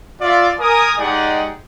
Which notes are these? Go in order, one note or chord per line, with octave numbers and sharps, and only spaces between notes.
F4 D5 E5
A#4 G#5 D#6
G#3 D#4 G4 G#4 D5 F#5